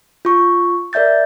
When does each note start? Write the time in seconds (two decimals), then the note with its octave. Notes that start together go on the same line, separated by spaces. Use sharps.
0.25 F4 C#6
0.93 A#4 D5 E5 G6 A6